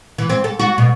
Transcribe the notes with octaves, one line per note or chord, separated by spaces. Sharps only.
E3
C4
A4
F#4
B2